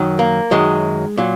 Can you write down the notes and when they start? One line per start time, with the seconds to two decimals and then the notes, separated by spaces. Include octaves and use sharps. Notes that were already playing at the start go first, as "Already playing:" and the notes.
Already playing: F#2 D#3 F#3
0.19 A#3
0.51 F#2 D#3 F#3 G#3
1.18 A#2 F#3